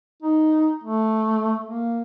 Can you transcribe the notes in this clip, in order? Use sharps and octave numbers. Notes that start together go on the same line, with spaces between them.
D#4
A3
A#3